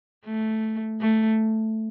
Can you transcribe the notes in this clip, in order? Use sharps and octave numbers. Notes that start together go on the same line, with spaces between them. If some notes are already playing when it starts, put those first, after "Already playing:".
A3
A3